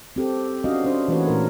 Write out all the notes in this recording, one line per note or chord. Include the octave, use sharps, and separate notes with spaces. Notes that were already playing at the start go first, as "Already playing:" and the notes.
C4 G4 A4
C#4 D4 F#4 D#5 F5
C#4 D4 C5
E3 A3 A#3 F#4 B4 C#5
A#2 A3 D#4 A#4